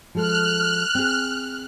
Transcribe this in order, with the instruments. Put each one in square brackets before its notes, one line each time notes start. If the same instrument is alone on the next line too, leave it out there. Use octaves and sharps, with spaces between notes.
[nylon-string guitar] F3 G#3 A4 [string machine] F6 F#6
[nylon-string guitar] C4 G#4